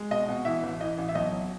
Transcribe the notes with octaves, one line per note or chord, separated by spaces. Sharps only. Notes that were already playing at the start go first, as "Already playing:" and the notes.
Already playing: G#3
B2 D#5
B2
E3 E5
A1
E3 D#5
A1
E5
B1 D#5
F#3